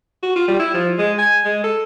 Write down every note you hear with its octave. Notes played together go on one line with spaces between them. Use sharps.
F#4
F4
G3
E4
F3
G#3
G#5
G#3
A4